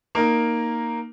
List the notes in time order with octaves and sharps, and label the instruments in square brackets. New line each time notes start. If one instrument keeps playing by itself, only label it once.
[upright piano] A#3 D#4 A#4